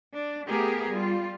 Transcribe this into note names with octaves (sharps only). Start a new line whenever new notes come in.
D4
A3 B3 G4 G#4 A#4
G3 F4